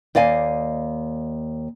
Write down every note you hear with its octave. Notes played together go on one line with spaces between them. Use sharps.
D#2 D5 D#5 F5 G#5